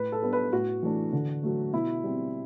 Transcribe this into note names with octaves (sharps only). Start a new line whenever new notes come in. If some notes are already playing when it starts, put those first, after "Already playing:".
Already playing: A2 B4
A4
G3 B3 D4
B4
A2 F#4
E3 A3 D4
D3
F#3 A3
B2 E4
G3 C4